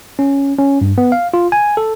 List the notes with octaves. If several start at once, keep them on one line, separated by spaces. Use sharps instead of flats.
C#4
C#4
G2
B3
F5
F4
G#5
A4